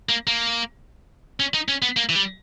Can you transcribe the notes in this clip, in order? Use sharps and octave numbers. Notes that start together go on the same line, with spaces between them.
A#3
A#3
C#4
D#4
C#4
B3
A#3
E3
G3